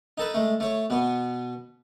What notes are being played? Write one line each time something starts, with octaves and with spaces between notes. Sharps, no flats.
D#4 A4 B4
G#3 A3
A3 C#5
B2 B3